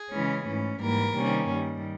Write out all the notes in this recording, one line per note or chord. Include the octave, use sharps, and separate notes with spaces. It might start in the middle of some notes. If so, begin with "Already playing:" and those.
Already playing: G#4
C#3 E3 G#3 C#4
G#2 E3 A3 C#4
G#2 E3 G3 A#3 A#4
C3 D#3 G3 A#3 C#4
G2 D#3 G3